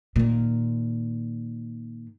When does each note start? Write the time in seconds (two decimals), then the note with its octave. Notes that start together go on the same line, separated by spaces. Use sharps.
0.16 A#2 D#3